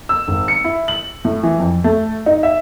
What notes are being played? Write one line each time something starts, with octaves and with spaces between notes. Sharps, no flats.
E6
G#1
C#7
E4
F#7
A2
E3
F2
A3
D#4
E5